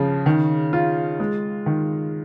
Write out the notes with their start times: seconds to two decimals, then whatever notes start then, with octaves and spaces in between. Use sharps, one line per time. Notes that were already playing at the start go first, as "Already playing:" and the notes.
Already playing: C#3 F3
0.26 D#3
0.73 F4
1.20 G#3
1.66 D#3